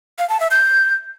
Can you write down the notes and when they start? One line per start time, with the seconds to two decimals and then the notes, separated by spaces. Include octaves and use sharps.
0.19 F5
0.29 A5
0.40 E5
0.51 G6